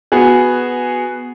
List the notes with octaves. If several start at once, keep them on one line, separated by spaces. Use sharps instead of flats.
B3 F#4 G#4